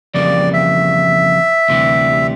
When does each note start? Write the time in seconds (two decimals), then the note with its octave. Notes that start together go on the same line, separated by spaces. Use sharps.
0.14 F2 C#3 E3 G3 A#3 D5
0.53 E5
1.69 D2 C3 E3 G3